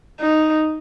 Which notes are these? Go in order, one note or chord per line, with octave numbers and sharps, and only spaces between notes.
D#4